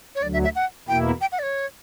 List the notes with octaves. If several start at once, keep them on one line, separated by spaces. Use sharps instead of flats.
C#5
D2 D3 F#3 D5
E5
E5
F#5
E2 B2 A#3 E4 G5
G5
F#5
D5
C#5